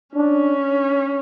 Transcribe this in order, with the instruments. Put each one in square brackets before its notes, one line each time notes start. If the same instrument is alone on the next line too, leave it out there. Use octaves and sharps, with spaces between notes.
[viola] C#4 [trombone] D4